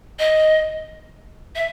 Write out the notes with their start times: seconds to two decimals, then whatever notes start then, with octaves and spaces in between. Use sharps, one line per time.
0.19 D#5
1.55 E5